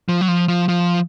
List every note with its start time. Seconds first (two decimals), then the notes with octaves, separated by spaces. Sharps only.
0.09 F3
0.21 F#3
0.28 F3
0.48 F3
0.69 F3